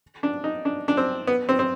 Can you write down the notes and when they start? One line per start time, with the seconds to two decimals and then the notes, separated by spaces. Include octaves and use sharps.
0.23 D4
0.44 D#4
0.65 D4
0.88 D4
0.97 C4
1.27 B3
1.49 C4
1.59 C4